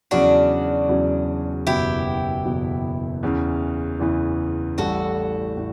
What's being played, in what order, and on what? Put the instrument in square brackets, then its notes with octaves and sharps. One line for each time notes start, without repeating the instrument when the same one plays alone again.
[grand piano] E2 C#3 F#3 C#4 [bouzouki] D4 F#4
[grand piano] E2 C#3 F#3 C#4
[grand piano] F#1 E2 B2 F#3 B3 [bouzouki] E4 G4
[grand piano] F#1 E2 B2 F#3 B3
E2 C#3 E3
E2 C#3 E3
[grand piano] A1 A2 G3 [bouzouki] F#4 A4
[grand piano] A2